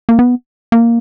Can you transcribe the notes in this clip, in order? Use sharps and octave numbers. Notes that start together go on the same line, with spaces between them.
A#3
B3
A#3